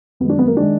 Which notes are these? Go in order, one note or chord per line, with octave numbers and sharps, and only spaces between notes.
F#2 D#3 G#3 B3
D4
B3
A#3
D#3 G#3 D4